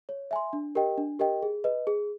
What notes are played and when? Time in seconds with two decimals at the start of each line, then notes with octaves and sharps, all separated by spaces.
0.09 C#5
0.31 E5 G#5 C6
0.53 D4
0.75 G4 A#4 D#5 G5
0.98 D4
1.19 G4 A#4 D#5 G5
1.43 G#4
1.64 B4 D#5
1.87 G#4